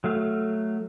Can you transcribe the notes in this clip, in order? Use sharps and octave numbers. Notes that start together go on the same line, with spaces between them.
F#3 A3 F5